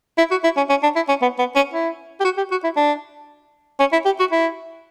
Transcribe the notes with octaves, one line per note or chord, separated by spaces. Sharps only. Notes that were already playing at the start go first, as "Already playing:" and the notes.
E4
F#4
E4
C#4
C#4
D4
E4
C#4
B3
B3
C#4
E4
G4
F#4
G4
F#4
E4
D4
C#4
E4
G4
F#4
E4